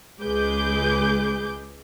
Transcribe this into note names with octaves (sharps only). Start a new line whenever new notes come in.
C#2 G#3 G#4 B4 D6 G6